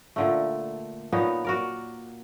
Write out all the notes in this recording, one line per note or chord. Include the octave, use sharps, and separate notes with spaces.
A#2 D3 A3
A#2 B3 D#4 C#5
F#4 A#4 D5